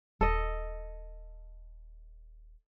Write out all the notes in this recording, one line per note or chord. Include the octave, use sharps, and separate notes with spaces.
D#1 A4 D#5